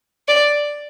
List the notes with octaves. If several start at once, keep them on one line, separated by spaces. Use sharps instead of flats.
D5